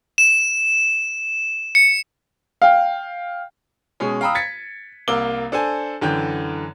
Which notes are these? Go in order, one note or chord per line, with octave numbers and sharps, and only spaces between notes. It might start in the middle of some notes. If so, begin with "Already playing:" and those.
E7
C#7
F5 G5
B2 G#3 C#4
F5 G5 A#5 B5 D#6 E6
G#6 A6 B6 C#7
C2 A#3 A#4 D6 E6 G7
D4 A4 C5 G#5
F#2 D3 E3 G5 G6